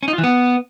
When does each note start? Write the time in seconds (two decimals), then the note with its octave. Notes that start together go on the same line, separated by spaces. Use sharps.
0.03 C#4
0.08 D#4
0.13 F4
0.18 E3
0.24 B3